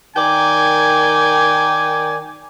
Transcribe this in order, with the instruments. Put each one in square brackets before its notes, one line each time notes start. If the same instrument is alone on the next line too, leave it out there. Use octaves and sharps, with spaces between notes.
[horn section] D#3 A#4 D5 G5 G#5